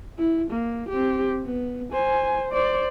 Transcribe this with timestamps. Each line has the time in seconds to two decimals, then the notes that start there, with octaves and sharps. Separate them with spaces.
0.18 E4
0.50 A#3
0.89 C4 G4
1.45 B3
1.92 C5 G#5
2.52 C5 D5